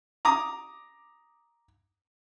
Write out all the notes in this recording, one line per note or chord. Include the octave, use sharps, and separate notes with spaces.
A#5 D6 D#6